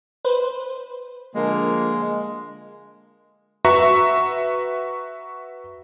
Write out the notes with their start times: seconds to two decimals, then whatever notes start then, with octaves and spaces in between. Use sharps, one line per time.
0.25 B4 C5
1.35 D3 F3 G#3 A#3
3.65 F#4 B4 E5 A#5 C#6